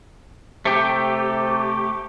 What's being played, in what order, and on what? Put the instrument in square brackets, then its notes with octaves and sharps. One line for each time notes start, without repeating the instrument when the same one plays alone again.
[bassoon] C3 [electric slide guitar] A3 G4